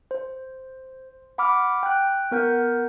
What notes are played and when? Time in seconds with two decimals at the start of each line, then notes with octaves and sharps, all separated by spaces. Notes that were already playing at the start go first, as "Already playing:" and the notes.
0.11 C5
1.38 F#5 B5 D6 F6
1.83 G5 F#6
2.31 B3 A#4 F#5 G6